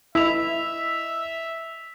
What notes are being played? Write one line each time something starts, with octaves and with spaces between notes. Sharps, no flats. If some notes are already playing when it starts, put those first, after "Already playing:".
E4 D#5 E5 E6 B6 F7